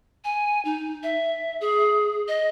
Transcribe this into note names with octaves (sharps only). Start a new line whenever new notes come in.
G#5
D#4
E5
G#4
D#5